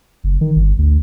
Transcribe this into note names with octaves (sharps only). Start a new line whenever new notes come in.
F#1
D#3
G1
D2